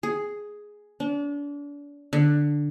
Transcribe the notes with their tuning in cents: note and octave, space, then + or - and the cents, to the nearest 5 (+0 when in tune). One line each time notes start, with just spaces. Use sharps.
G#4 +5
D4 -35
D3 +5